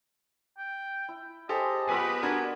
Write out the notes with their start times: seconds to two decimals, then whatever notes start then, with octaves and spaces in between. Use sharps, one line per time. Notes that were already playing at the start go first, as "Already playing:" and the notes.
0.58 G5
1.09 E4
1.49 G#3 G4 A4 C5 D#5 G5 G#5
1.89 B3 F4 G4 G#4 B4 G#5 E6
2.23 D4 F#4 A#4 G#5